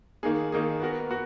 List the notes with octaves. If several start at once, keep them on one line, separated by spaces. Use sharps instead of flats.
D#3 A#3 D#4 G#4
D#3 A#3 D#4 G#4
B3 F#4 A#4
B3 F#4